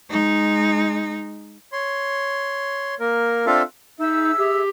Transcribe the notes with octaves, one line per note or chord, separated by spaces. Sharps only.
G#3 D#4
C#5 C6
A#3 A#4
C4 D4 F4 A4 E5 F5
D#4 G#4 E5 E6
G4